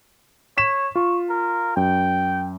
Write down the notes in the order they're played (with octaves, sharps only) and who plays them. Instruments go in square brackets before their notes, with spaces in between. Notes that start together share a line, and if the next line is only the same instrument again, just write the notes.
[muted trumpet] C#5 [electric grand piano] B6 E7
[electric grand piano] F4 [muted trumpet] C#6
[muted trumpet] A#4
[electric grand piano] F#2 [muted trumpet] G5